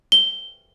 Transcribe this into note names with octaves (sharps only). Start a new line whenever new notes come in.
G7